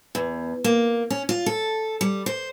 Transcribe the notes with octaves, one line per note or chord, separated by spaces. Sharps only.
E2
A#3
C#4
F4
A4
G3
C5